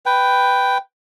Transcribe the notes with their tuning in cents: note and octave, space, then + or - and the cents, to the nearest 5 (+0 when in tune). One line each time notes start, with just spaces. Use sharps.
B4 +5 G5 +0